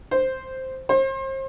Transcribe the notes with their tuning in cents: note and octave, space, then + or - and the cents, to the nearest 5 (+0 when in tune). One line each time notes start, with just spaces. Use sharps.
C5 +0
C5 +35